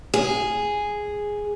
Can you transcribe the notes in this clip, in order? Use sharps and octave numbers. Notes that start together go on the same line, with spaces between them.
G#4